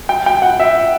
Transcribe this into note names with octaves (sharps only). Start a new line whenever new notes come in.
G5
G5
F#5
E5